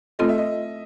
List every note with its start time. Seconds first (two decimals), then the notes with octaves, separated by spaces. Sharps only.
0.19 A3 C4 F4 A4 D#5
0.29 E5
0.38 D#5